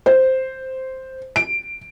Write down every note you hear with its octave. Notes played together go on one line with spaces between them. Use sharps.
C5
D7